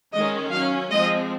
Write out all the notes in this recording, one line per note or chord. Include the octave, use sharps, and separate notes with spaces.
D#3 G#3 C#4 D#5
F#3 C#4 F5
F3 G#3 C4 D#5